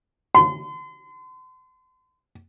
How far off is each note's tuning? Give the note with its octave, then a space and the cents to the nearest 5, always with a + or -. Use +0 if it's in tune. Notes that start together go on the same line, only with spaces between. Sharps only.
C6 -40